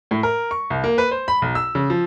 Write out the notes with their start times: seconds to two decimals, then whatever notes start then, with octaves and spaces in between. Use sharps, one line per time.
0.11 A2
0.23 A#4
0.51 C#6
0.70 C2
0.84 A#3
0.98 B4
1.11 C5
1.28 B5
1.42 B1
1.55 E6
1.75 C#3
1.90 F3